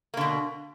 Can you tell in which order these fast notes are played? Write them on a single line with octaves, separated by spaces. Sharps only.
A#3 D3 B2